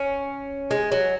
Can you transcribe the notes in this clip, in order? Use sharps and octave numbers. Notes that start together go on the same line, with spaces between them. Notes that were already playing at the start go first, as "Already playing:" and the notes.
Already playing: C#4
G#3
F#3